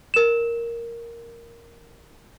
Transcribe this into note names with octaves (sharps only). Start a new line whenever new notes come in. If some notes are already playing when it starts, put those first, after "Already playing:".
A#4 E7